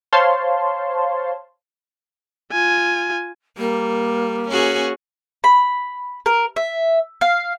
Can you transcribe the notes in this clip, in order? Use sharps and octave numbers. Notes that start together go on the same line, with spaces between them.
C5 C#5 F5 A5 C6
F4 G#5
G3 A#3
C#4 F#4 G#4
B5
A#4
E5
F5